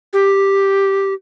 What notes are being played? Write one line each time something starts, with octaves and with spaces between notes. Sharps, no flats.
G4